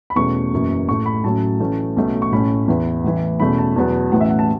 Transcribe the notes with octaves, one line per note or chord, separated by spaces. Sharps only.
B5
E2 B2 A3 C#4 C#6
F#1 F#2 E3 C#4
A1 A2 A3 C#6
B5
A1 A2 F#3 A3 C#4 A5
A1 A2 E3 A3 C#4
B1 B2 A3 C#4
C#6
A1 A2 A3 C#4 B5
E2 E3 B3
A1 A2 E3
E2 B2 A3 C#4 B5
A5
E2 B2 F#3 B3
A1 A2 E3 C#4 F#5
E5
F#5
A5